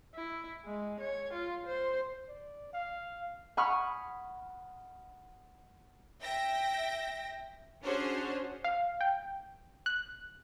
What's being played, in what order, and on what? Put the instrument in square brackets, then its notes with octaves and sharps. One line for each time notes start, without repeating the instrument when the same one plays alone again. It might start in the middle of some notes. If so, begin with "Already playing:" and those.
[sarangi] E4
G#3
C#5
F4
C5
[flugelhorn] D5
F5
[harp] F#5 G#5 B5 C#6 D#6 F6
[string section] E5 G5 A#6
C#4 D4 F#4 G#4 C5 C#5
[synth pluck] F5
G5
F#6